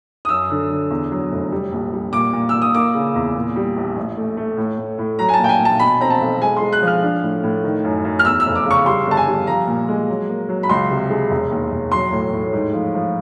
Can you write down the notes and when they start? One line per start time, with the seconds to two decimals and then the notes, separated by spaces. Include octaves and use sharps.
0.25 D#6
0.29 F#2 E6
0.50 D3
0.70 D3
0.90 E2
1.11 F#3
1.32 F1
1.52 G3
1.72 A#1
1.93 G3
2.13 A#2 D6
2.33 A#2
2.49 A#2 E6
2.62 D#6
2.74 A#3 D6
2.94 C#3
3.16 E2
3.35 A#2
3.56 G3
3.77 A#1
3.96 A1
4.17 A3
4.37 A3
4.57 A2
4.78 A2
4.98 A2
5.19 F#3 A#5
5.29 G#5
5.34 A5
5.39 A#2
5.44 G5
5.49 G#5
5.60 A#2 A5
5.80 B2 B5
6.01 C4 A#5
6.10 A5
6.21 B1
6.41 G#3 G#5
6.56 G#3 C6
6.73 F#6
6.82 F3 F6
7.02 D4
7.23 A2
7.43 A2
7.64 D#3
7.84 F#2
8.05 F#2
8.19 F6
8.25 E2 E6
8.40 E6
8.46 F1
8.55 D6
8.66 C#3 C#6
8.86 G3 C6
9.07 G1 A5
9.17 G#5
9.27 G3
9.47 F3 A#5
9.67 A#2
9.88 G#3
10.08 F#3
10.29 A#3
10.49 F#3
10.63 B5
10.69 C#2 C6
10.91 C3
11.10 G#3
11.31 E1
11.51 D#2
11.71 E1
11.92 F#3 C6
12.12 A2
12.33 A2
12.53 G#2
12.73 F3
12.95 F3